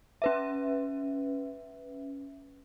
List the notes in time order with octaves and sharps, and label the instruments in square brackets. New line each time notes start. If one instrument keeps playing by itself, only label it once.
[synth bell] C#4 B4 E5